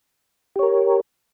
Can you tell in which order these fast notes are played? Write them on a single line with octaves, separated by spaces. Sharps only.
G4 C#5 A#4